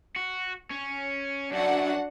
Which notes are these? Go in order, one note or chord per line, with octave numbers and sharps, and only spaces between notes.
F#4
C#4
F#2 D4 F#4 F#5